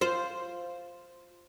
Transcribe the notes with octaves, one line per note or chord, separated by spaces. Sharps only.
F4 C5